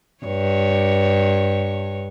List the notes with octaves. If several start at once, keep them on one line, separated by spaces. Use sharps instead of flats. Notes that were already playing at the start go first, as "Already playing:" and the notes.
G2 C#5